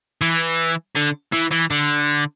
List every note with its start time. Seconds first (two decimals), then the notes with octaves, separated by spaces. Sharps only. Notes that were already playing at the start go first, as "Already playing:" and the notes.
0.21 E3
0.96 D3
1.33 E3
1.52 E3
1.71 D3